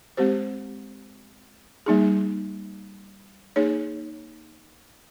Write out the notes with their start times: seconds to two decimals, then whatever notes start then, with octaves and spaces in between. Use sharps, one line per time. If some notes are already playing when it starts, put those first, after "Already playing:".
0.17 G#3 C4 G4 C5
1.86 G3 A#3 D#4 G#4
3.56 A#3 D#4 G#4 C#5